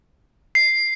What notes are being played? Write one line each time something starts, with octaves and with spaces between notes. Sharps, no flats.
C7